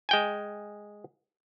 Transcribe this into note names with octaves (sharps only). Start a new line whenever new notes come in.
G#3 G5 G#5